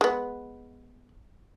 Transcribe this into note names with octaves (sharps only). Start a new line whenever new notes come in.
G#3 B3